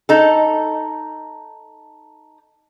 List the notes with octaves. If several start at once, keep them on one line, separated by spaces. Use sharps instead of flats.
D#4 A4